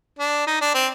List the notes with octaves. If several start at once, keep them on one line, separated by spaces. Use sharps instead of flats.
D4
D#4
D4
C4